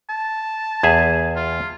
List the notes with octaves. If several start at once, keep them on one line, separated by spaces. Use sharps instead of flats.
A5
E2 G#4 E5 G#6
F4